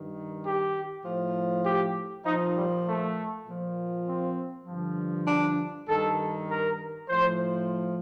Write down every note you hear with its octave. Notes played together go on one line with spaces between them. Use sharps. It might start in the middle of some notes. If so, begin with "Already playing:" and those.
Already playing: G2 D#3
G4
A2 F3
G4
A#2 F3 D#4
G3
A3
A#2 F3
C4
G2 D3 F3
D4
G2 D#3 A4
A#4
A2 F3 C5